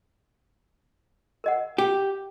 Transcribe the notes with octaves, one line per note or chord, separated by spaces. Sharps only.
A#4 D#5 F#5
G4